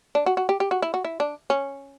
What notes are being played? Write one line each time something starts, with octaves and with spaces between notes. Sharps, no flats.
D4
F#4
F#4
G4
G4
F#4
E4
F#4
E4
D4
C#4